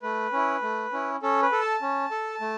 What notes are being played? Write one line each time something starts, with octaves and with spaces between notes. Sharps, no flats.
A3 B4
C#4 E4
A3
C#4 E4
C#4 A4
B4
A4
A5
C#4
A4
A3